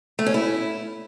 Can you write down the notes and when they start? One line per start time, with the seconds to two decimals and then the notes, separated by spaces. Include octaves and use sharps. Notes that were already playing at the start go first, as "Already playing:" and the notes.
0.19 A3
0.26 C#4
0.34 E4